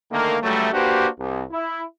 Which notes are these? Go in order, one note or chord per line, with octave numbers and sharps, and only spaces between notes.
D3 D#3 A3 A#3
C#2 F#3 G3 A3
A#3 D4 F#4 G4 B4 C5
C2
E4